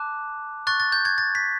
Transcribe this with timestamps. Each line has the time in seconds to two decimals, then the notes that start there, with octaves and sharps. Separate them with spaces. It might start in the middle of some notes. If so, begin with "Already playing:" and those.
Already playing: A5 D6 F#6
0.67 C#6 F#6 A6
0.80 A6
0.92 G6
1.05 G#6
1.18 A6
1.35 B6